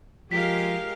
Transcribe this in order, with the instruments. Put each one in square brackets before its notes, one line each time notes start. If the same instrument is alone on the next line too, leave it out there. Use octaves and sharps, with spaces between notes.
[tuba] F3 [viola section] G#3 F5 [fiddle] G4 A#4 [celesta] B6